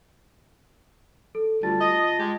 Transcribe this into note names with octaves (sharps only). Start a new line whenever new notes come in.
A4
D2 G3 F4 A5 A6
D#5
G#3 G4